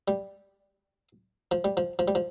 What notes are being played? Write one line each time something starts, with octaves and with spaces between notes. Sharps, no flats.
G3
F3
G3
F3
F3
G3
F3